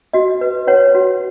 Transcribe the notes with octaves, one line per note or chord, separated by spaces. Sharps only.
F#4 D#5
B4
B4 C#5 F#5
F#4